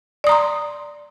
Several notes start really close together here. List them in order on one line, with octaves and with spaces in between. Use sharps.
D5 D#6 A#5 C6